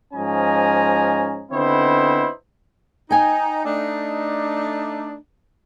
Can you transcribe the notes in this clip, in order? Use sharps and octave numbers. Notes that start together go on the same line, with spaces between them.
G#2 F3 C#4 D#5 G#5 A#5
D3 B3 C4 D#4 E4 C5
D#4 G5 G#5
A3 D4 D#4